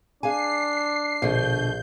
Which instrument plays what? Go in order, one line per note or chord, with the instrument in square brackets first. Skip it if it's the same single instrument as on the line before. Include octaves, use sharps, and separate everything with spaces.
[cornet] D4 [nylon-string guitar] G#4 F5 G#5 [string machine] C7
[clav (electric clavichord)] A#1 [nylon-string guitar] B2 D3 [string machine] G6